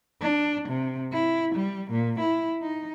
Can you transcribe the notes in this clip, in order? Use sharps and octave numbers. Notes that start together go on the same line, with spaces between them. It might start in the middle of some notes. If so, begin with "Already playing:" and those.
D4
C3
E4
G3
A#2
E4
D#4